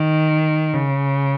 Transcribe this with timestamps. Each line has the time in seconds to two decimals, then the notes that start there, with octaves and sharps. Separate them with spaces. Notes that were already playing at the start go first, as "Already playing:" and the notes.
Already playing: D#3
0.74 C#3